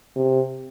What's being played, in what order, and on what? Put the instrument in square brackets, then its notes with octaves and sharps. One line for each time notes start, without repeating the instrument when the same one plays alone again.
[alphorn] C3